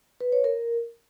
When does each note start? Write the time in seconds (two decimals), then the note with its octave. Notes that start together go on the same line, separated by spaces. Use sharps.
0.21 B4
0.32 C#5
0.44 A#4